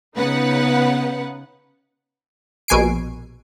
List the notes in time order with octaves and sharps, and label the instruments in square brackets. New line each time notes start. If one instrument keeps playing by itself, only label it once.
[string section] C#3 B3 D#4 B4 F#5
[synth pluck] A#1 B2 G#5 C7 D7